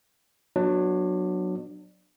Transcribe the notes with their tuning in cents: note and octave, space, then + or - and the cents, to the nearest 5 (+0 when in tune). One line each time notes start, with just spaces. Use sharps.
F#3 -10 B3 -15 D4 +25